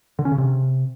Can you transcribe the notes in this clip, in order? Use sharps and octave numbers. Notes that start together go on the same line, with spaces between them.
D3
C#4
C#3
C3